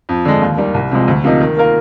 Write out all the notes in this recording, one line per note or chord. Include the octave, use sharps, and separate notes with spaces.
F2
D3 G#3
D#2
D#3 G3 A#3
C2
C3 F3 G#3
D2
C3 F3 A#3 D#4
D#3
A#3 F4 A#4